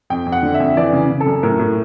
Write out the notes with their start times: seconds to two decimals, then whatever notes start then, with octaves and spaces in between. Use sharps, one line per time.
0.10 F2 G5
0.26 F2
0.32 F#5
0.43 D3
0.54 E5
0.60 F2
0.77 E3 D5
0.93 C#3
1.10 C#3
1.20 A4
1.26 F#2
1.43 A2 A#4
1.59 A2